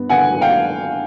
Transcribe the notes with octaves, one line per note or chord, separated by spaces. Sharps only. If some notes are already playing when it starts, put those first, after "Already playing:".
Already playing: G2 B3
D3 F#5 G#5
F#3
F5 G5